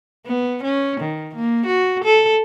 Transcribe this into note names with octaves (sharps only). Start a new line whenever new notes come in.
B3
C#4
D#3
A#3
F#4
A4